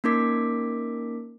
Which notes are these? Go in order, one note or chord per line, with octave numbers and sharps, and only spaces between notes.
A#3 C#4 D#4 A#4 D6 B6